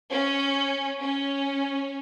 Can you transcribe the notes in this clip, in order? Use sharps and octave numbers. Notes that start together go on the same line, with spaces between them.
C#4
C#4